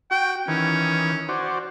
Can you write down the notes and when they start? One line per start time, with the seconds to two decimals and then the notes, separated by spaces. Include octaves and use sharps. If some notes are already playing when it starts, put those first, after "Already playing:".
0.11 F#4 G5
0.48 D#3 E3 C#4
1.29 F#4 C5 D5